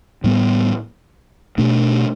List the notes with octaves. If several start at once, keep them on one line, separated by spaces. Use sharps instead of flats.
A2 G3 B3
B2 A3 D4